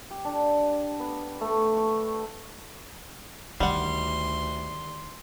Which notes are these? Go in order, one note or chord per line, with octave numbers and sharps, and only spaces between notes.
G4
D4
B3
A3
C#6
D2 D3 D#3 G3 F#5 C6